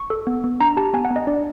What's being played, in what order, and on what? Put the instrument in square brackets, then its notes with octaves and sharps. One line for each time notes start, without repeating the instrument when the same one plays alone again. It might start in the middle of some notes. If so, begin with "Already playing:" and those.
Already playing: [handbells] C#6
A4
B3
B3
D4 A#5
G4 A5
B3 G#5
F#5
B3
D#5
D4 D5